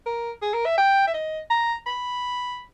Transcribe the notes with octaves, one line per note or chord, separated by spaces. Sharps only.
A#4
G#4
A#4
E5
G5
E5
D#5
A#5
B5